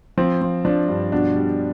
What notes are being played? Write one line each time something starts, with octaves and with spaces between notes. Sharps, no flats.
F3 C4
F3
F3 D4
G2
B2 D4
G3